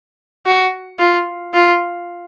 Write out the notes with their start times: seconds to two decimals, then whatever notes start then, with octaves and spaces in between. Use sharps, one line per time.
0.46 F#4
0.99 F4
1.54 F4